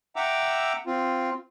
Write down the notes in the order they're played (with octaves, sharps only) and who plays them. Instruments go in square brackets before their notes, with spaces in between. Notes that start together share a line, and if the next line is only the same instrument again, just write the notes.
[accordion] E5 F#5 G5 A#5 D6 E6
C4 F4